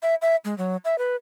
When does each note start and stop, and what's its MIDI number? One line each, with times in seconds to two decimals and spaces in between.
0.02 0.15 76
0.22 0.36 76
0.45 0.56 56
0.58 0.77 54
0.85 0.98 76
0.98 1.16 71